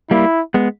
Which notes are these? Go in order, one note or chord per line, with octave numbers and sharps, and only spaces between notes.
G3 A#3 E4
G#3 B3